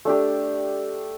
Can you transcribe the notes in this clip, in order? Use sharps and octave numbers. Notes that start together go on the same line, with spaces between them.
A3 D4 G4